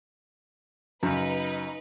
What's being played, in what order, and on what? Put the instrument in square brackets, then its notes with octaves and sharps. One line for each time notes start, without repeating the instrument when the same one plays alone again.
[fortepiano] F#2 C#3 [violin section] D#4 B4